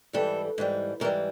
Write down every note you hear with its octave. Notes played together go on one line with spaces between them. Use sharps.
G#2 E3 G3 A4
G#2 E3 G3
G#2 E3 G3 A#4